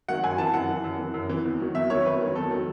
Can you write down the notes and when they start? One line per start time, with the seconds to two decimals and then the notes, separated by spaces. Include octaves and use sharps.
0.08 D#3 F#3 F#5
0.23 F#2 G#5
0.38 E3 A5
0.54 F#2 F#5
0.69 E3
0.84 F#2
0.99 E3
1.14 F#2
1.29 E3
1.45 E2
1.60 D#3 F#3
1.75 E2 E5
1.90 D#3 F#3 C#5
2.05 E2 B4
2.20 D#3 F#3
2.35 E2 A4
2.51 D#3 F#3